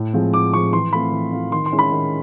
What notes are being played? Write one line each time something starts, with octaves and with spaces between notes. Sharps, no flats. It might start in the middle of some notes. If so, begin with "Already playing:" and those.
Already playing: A2
F3 G#3 C4
A2 D6
F3 G#3 C4 C#6
E3 C6
A3 C4 F4 B5
E3
A3 C4 F4
D#3 C6
C6
G#3 C#4 E4
B5
D#3